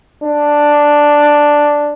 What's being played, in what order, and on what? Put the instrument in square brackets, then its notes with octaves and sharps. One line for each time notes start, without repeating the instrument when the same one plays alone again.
[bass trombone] D4